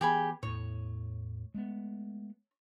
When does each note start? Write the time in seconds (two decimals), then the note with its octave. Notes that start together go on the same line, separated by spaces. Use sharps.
0.01 E3 B3 G4 G#4 B5
0.43 E2 A2 C#5
1.54 G#3 A3 B3